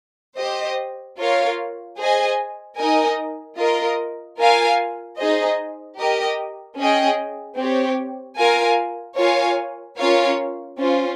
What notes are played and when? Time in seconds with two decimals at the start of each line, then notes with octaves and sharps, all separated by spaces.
0.39 G4 C5 D#5
1.19 F4 A#4 C#5 F5
2.00 G#4 C5 D#5 G#5
2.79 D#4 A#4 D#5 G#5
3.59 F4 A#4 D#5
4.39 F4 A#4 F5 G#5
5.19 D#4 G#4 C5 D#5
5.99 G4 A#4 D#5
6.79 C#4 G#4 D#5 G5
7.59 C4 G4 C#5
8.39 F4 A#4 F5 G#5
9.18 F4 A#4 C#5 F5 G#5
9.99 C#4 F4 A#4 C#5 F5
10.78 C#4 F4 C5